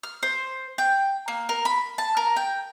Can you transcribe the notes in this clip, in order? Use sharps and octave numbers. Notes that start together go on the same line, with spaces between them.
F6
C5
G5
A#3
A#4
B5
A5
A#4
G5